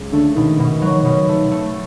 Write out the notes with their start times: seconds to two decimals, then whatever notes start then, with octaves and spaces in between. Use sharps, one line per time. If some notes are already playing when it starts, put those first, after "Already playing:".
Already playing: C#2 F#3
0.12 D3 A3
0.36 B2 D#3
0.59 B2
0.82 F#3
1.05 B2
1.29 A3
1.51 A3